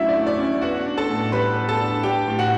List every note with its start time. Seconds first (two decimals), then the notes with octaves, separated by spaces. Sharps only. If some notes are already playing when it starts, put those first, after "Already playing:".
Already playing: D3 F#3 A3 C#4 E4 E5
0.09 D5
0.15 A3
0.27 D5
0.39 C#4
0.62 B3 F#4 F#5
0.86 D4
0.98 A4 A5
1.09 A2
1.32 G3 B4 B5
1.56 B3
1.69 A4 A5
1.80 D4
2.03 D4 G4 G5
2.28 A2
2.39 F#4 F#5